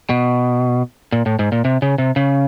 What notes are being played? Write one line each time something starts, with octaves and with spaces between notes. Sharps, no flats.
B2
A#2
A2
G#2
A#2
C3
C#3
C3
C#3